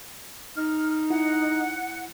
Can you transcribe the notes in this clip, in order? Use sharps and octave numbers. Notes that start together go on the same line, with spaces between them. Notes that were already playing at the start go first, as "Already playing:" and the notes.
D#4 F6
E4 F#5